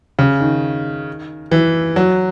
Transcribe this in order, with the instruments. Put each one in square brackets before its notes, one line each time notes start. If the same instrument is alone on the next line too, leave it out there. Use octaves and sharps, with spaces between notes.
[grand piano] C#3
D#3
E3
F#3